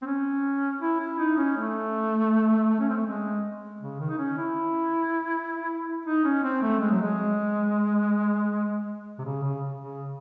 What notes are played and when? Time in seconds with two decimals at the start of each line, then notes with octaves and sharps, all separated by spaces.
0.02 C4
0.06 C#4
0.81 E4
1.00 E4
1.19 D#4
1.37 C#4
1.56 A3
2.80 C#4
2.89 C4
2.97 A3
3.06 G#3
3.81 C#3
4.00 D#3
4.10 D#4
4.18 C#4
4.37 E4
6.06 D#4
6.24 C#4
6.43 C4
6.62 A3
6.80 G#3
6.91 F#3
7.02 G#3
9.19 C3
9.25 C#3
9.43 C#3
9.80 C#3